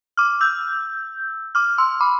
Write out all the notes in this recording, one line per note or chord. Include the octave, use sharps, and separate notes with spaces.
D6 F6
E6 G6
D6 F6
C6 E6
B5 D6